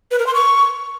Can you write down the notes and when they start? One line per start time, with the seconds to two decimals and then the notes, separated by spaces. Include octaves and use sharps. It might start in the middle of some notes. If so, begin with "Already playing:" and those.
0.11 B4
0.19 A#4
0.27 C6
0.34 C#6